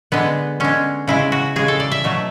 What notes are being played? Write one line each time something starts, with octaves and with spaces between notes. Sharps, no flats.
D3 G#3 B3
D3 G#3 C#4
C#3 G#3 E4
F#4
C#3 G#3 G#4
A4
D5
E5
B2 F#3 A3